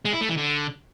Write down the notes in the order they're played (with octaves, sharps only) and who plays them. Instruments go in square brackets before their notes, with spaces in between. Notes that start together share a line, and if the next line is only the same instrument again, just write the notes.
[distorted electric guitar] G#3
E4
A3
E3
D3